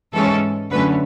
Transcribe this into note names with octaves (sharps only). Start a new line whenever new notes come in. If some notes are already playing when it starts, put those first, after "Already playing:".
G#2 E3 G#3 C#4 A4
F#2 D3 A3 C#4 B4